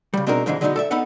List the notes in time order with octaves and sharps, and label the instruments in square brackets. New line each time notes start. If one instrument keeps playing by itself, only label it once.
[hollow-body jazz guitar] C#3 G3
B2 C4 D4 D#4 G#4 A#4
F2 G#2 D3 E3 G#3
D3 F#3 G#3 B3 D4 D#4
A4 D5 E5
B3 D#4 A4 B4 F#5